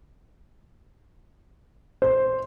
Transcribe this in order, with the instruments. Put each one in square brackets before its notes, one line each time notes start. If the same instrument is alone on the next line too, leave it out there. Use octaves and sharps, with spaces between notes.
[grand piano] C5